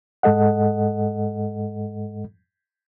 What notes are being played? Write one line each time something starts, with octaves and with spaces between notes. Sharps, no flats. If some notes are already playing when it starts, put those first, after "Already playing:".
G#2 G#3 A4 D#5 F#5